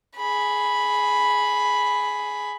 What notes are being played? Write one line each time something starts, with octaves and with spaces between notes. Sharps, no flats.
G#4 B5